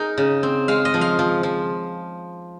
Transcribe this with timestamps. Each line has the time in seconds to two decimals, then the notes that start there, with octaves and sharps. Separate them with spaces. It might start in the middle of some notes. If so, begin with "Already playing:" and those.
Already playing: D#4 G#4 A#4
0.18 C#3
0.43 C4
0.68 G#3 F5
0.85 D#5
0.94 F3
1.01 F5
1.19 F3
1.43 F3